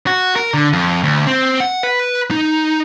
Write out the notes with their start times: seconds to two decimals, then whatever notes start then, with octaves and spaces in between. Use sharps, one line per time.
0.07 F#4
0.36 A#4
0.54 D3
0.73 F2
1.03 D2
1.27 C4
1.60 F#5
1.83 B4
2.31 D#4